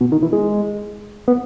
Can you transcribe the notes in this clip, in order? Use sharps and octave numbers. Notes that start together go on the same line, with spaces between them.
B2
D#3
E3
G#3
B3